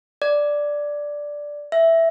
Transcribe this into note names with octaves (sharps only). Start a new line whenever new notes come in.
D5
E5